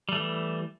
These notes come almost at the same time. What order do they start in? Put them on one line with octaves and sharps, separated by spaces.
G3 A3 E3